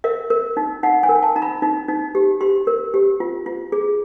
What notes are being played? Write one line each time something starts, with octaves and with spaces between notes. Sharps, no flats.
A#4 E5
A#4
D#4
D#4 F#5
G#5
A#4
A5
D#4 A#5
B5
D#4
D#4
G4
G4 C6
A#4
G4
F4
F4
G#4